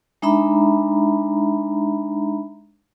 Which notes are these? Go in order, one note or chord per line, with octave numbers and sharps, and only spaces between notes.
G#3 D4 D#4 E5 A#5 B5